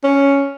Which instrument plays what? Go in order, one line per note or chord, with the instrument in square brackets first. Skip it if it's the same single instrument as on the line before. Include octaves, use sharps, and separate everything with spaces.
[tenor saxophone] C#4